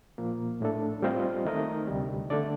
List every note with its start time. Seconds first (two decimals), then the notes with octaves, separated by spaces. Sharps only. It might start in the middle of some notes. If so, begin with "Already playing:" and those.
0.18 A#2 F3 A#3
0.60 A2 A3 D4 A4
1.02 G3 C4 F4 C5 D#5
1.45 D#3 A3 D#4 A#4 D#5
1.87 D2 C3 G3
2.30 D3 A3 D4 A4 D5